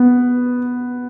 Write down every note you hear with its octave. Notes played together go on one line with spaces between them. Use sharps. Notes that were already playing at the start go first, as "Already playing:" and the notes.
Already playing: B3